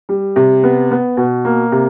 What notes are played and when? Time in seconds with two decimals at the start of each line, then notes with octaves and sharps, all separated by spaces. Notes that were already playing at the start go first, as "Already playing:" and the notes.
0.09 G3
0.36 C3
0.63 B3
0.91 B3
1.17 B2
1.45 A#3
1.72 C3